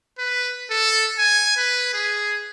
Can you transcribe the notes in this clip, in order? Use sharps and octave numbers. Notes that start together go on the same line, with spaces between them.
B4
A4
G#5
B4
G#4